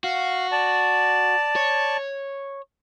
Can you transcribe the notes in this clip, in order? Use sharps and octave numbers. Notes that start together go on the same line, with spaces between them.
F#4 F5
D5 A5
C#5